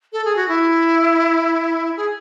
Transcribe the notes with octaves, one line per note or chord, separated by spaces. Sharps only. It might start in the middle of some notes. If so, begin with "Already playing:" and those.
A4
G#4
F#4
E4
G#4